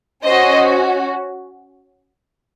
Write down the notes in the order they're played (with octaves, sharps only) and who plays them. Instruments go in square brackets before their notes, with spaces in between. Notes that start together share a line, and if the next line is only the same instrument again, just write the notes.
[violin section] C#4 F#4 C5 D#5